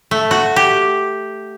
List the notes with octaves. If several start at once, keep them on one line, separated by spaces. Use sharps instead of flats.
A3
F#4
G4